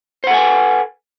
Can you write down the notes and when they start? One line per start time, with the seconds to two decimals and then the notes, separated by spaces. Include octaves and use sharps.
0.24 C5
0.27 F#5
0.30 A4
0.34 G#5
0.37 B4